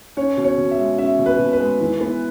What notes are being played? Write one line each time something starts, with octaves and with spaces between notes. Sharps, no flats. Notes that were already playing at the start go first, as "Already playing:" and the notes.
C#4 C#5
B2
C#5
B2
E5
G#3
C#4 E5
B2
B4
B2
B4
G#3
E3
B3